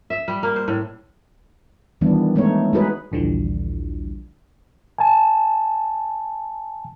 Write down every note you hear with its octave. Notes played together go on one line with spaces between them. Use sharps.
E5
G3
A#3
C5
A2
D#3 E3 G3 B3 D4
G#3 A3 B3 D#4 C#5
G#3 D#4 F#4 G#4 B4 C#5
A#1 D#2 D3 E3 F3 G3
G#5 A5